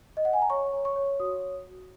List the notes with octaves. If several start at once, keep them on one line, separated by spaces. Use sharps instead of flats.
D#5
F#5
G#5
A#5
C#5 C#6
C#5
C#6
C#5
F#4 D#6